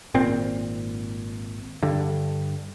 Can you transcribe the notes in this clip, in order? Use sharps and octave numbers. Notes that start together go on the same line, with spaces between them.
G#1 A#2 C4
G2 D3